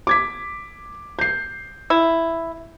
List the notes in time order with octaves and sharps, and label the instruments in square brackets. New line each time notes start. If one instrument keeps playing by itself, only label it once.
[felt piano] D6 G#6 B6
G6 C7
[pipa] E4